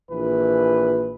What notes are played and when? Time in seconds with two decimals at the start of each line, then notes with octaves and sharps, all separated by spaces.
0.12 A#1 E3 B4